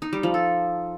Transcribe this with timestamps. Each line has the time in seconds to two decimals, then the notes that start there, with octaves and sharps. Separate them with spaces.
0.02 D#4
0.13 G3
0.23 F3
0.34 A4